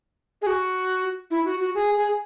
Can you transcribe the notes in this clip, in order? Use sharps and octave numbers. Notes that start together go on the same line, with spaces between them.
G#4
F#4
E4
F#4
F#4
G#4
G#4